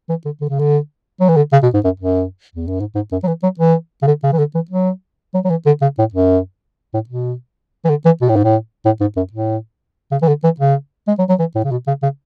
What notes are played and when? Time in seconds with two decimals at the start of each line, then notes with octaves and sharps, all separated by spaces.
0.09 E3
0.25 D3
0.41 D3
0.49 C#3
0.59 D3
1.20 F#3
1.29 E3
1.36 D3
1.52 C#3
1.63 B2
1.74 G#2
1.84 F#2
2.00 F#2
2.55 E2
2.67 F#2
2.80 G#2
2.95 G#2
3.12 F#2
3.23 F#3
3.27 E3
3.43 F#3
3.59 E3
4.02 C#3
4.07 D3
4.23 C#3
4.32 E3
4.38 D3
4.54 E3
4.70 F#3
5.34 F#3
5.44 F#3
5.50 E3
5.66 D3
5.82 C#3
5.98 A2
6.14 F#2
6.94 A2
7.09 B2
7.85 E3
7.89 D3
8.05 E3
8.21 B2
8.29 A2
8.36 G#2
8.43 A2
8.85 A2
9.00 G#2
9.16 F#2
9.33 A2
10.11 C#3
10.22 E3
10.27 D3
10.44 E3
10.60 C#3
11.08 G#3
11.18 F#3
11.29 F#3
11.39 E3
11.55 A2
11.64 C#3
11.71 B2
11.87 C#3
12.03 C#3